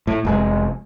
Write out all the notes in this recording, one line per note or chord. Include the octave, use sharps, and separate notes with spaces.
A2
F1 G#2 G#3